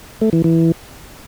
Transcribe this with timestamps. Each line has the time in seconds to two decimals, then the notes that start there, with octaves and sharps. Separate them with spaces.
0.21 A3
0.33 E3
0.44 E3